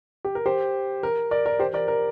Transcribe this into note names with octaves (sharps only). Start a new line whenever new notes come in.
G4
A#4
G4 C5
A#4
A#4 D5
A#4 D5
G4 C5
A#4 D5
A#4